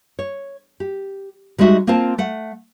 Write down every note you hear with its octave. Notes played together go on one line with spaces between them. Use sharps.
C#5
G4
G3 G#3 D#4 F#4 E5
A#3 C4 F4 C5 A5
A3 F#5